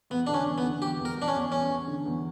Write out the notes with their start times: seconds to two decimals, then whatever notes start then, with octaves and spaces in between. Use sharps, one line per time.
0.10 E2 B3
0.27 D3 D4
0.34 C#4
0.46 E2
0.58 B3
0.64 D3
0.82 E2 G4
0.99 E2
1.05 A#4
1.17 E2
1.22 D4
1.28 C#4
1.34 E2
1.52 E2 C#4
1.70 E2
1.87 D3
2.06 E2